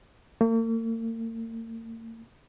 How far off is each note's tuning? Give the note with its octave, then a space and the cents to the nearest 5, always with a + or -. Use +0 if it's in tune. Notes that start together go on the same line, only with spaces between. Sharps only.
A#3 -45